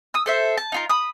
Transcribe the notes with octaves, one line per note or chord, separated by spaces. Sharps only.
D#6 E6
A4 C5 E5
A5
D#4 F4 A#4
B5 D#6